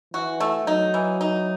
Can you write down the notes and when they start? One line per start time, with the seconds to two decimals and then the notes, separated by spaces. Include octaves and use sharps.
0.13 E3 F#4
0.40 A3
0.67 F#3 D#4
0.94 E3
1.21 D#4